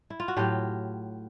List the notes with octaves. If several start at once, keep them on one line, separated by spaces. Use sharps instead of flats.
E4
F4
F#4
A2 F#3 F4 G4